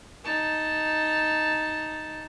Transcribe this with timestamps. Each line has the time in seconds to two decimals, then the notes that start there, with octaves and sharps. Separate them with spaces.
0.24 D#4 A5